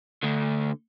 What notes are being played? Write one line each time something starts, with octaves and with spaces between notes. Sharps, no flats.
D2 D3